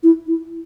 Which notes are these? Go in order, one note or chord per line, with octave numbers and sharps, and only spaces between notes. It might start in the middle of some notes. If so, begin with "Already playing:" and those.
E4
E4